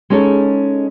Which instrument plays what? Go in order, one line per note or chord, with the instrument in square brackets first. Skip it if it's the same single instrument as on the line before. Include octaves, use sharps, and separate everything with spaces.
[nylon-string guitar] G#3 C#4 D#4 A4 C#5